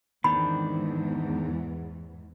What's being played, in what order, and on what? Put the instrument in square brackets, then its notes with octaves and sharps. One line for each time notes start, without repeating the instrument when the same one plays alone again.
[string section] E2 G#2 E3 [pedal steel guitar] D#3 C4 D4 [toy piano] B5